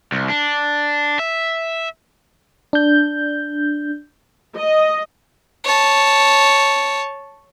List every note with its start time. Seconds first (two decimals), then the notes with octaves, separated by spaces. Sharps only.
0.12 C2
0.30 D4
1.19 E5
2.73 D4 G6
4.57 D#5
5.64 C#5 A5